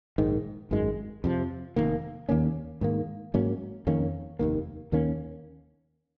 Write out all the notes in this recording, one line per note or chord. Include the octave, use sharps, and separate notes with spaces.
A#1 G#2 D#3
G#1 F#2 D#3 G#3
F2 C3 F3
F1 F2 D#3 A#3
D#2 D#3 A#3 C#4
G#2 D#3 A#3
G#2 F#3 A#3 C#4
F2 D#3 A#3 C#4
F1 D#2 D#3 A#3
D#2 D#3 A#3 C#4